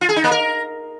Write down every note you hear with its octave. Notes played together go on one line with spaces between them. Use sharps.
F4
G#4
D#4
A#3
A#4